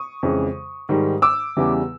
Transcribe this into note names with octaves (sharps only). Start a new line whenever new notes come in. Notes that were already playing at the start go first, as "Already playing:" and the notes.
Already playing: C#6 D#6
F2 C#3 E3 G#3
G#2 D#3 G3
D6 E6
E2 C#3 E3 G3